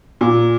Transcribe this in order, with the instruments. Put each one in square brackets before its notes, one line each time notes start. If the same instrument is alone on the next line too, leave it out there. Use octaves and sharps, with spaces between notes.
[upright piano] A#2